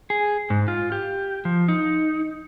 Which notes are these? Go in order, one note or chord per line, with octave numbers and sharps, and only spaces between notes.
G#4
G#2
F4
G4
F3
D#4